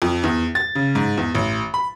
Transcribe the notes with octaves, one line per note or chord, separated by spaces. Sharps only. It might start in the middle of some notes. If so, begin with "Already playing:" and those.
F2
E2
A6
C#3
G#2
E2
A1
B5